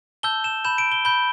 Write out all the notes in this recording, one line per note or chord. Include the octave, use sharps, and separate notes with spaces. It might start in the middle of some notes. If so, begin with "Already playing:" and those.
A5 E6 G6 G7
E7
B5 G6 E7
D7
G7
B5 G6 G7